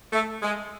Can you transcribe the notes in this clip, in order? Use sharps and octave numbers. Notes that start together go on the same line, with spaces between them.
A3
G#3